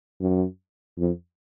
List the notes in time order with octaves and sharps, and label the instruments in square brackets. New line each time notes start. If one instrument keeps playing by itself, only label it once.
[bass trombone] F#2
F2